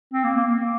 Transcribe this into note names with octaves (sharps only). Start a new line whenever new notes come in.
C4
A#3
A#3
A#3